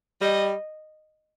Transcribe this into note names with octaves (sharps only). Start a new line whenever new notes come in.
G3 D#5